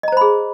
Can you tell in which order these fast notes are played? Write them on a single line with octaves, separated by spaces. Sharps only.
D#5 A#5 C5 B5 G#4